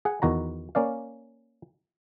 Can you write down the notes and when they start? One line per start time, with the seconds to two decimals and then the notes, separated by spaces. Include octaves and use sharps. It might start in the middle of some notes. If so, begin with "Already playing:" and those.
0.05 G#4 F#5
0.22 E2 D#3 F#4 A#5
0.75 A#3 C#4 D5 F5